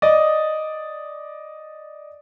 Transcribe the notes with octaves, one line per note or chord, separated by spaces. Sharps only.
D5 D#5 D#6